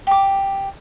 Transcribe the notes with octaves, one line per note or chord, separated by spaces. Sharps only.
G4 D6